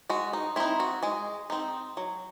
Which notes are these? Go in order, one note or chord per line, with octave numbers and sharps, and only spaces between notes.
G#3 F#4
D#4
C4 D#4 E4
F#4
G#3 G#4
C4 D#4
F#3